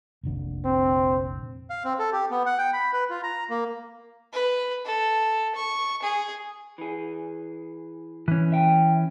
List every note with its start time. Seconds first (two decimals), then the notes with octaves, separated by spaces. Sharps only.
0.23 F1 A#1 D3
0.65 C4
1.70 F5
1.84 C4
1.99 A4
2.12 G4
2.31 B3
2.46 F#5
2.58 G5
2.73 B5
2.93 B4
3.10 F4
3.23 A#5
3.50 A#3
4.33 B4
4.85 A4
5.55 C#6
6.02 G#4
6.78 E3 G#4
8.28 E3 C#4
8.52 E5 G5